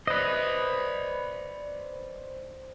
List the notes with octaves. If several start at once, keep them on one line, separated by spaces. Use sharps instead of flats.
B4 C5 D5 D#5